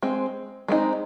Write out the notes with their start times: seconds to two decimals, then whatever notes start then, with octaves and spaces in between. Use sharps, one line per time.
0.03 G#3 C4
0.68 G#3 C4 D#4